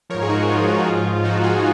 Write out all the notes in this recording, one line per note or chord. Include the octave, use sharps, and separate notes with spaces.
G#2 F3 A#4 C#5
G#4
D#4 F#4
G#2 F3 F4
D#4
G#2 F3 F4
G#2 F3 D#4 F#4
F4 G#4